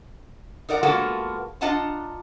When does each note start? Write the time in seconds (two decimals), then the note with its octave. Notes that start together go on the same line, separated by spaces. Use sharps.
0.69 D#4 A#4 D5 F#5
0.83 G#3 A#3 B3 F4 F#4 A4
1.61 D4 F4 D#5 F#5 A5 A#5